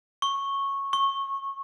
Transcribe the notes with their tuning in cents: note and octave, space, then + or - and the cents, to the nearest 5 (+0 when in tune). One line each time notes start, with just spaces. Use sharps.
C#6 -10
C#6 -20